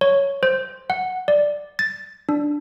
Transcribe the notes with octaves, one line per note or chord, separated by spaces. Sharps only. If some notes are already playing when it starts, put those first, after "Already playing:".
C#5
C5
F#5
D5
A6
D4